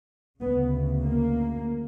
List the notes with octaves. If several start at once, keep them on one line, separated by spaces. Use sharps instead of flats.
D2 C#3 B3
A#3